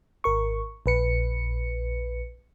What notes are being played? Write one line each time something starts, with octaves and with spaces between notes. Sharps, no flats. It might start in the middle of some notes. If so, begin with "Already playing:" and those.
G#1 A#4 C#6
A#1 B4 C#7